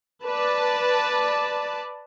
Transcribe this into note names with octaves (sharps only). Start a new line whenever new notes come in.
B4 D5 A5